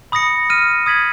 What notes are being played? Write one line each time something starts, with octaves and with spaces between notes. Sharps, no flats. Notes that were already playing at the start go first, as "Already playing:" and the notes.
B5 D#6 A#6 C#7
F6 A#6 D#7
D#6 G#6 B6 F#7